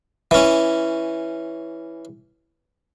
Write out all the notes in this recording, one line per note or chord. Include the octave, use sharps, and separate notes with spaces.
E3 C#4